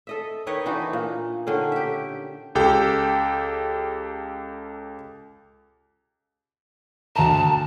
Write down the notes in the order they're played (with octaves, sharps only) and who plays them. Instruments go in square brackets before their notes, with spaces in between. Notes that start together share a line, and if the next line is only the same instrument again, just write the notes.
[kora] A4 D#5 E5
D#3 B4 C#5 D#5
E3 D4 D#4 F#4
A#2
D3 D#3 C#4
G4 E5
[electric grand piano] C#2 G4 A4 G5
[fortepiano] D2 A#5 [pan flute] A5